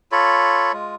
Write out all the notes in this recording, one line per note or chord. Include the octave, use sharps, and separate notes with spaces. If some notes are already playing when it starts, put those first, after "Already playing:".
F4 A4 C#5 B5
G#3 F4